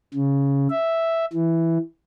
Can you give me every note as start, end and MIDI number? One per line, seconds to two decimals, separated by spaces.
0.14 0.68 49
0.70 1.25 76
1.33 1.78 52